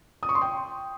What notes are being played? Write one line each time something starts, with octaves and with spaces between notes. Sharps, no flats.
D#6
C#6
C6
G5